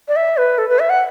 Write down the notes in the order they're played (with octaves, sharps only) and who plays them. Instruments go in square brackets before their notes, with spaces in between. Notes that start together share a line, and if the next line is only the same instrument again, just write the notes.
[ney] D5
E5
B4
A4
B4
E5
F#5